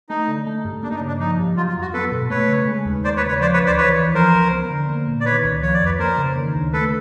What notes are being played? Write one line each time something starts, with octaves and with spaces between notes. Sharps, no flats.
A3 D#4
D3
A3
G2
A#3 D4
D#4
D4
C#3
D4
F3 D#4
G2
F#3 F4
F4
F2
F#4
B3 A4 B4
B2
A3 B4 C#5
C#3
G#3
D#2
A#3 C5 D5
B4 C#5
C#3
B4 C#5
F3 C5 D5
B4 C#5
D2
C5 D5
E3 B4 C#5
E2
F3 A#4 C5
C#2
B3
D3
A#3
A#2
D5
D#3 B4 C#5
C#2
F3 C#5
D5
F2 B4 C#5
A#3 A#4 C5
C#3
D#3
D2
A3 A4 B4